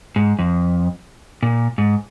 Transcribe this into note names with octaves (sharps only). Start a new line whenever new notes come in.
G#2
F2
A#2
G#2